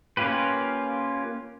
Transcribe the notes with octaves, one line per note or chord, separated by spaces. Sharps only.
A#3 C#4 F4 G4 B4